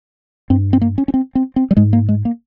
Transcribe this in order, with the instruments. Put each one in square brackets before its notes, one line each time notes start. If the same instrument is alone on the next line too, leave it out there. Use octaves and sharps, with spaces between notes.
[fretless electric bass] G2 C4
C4
A#3
C#4
C#4
C4
C4
C4
G3
G#2 G#3
A#3
G#3
A#3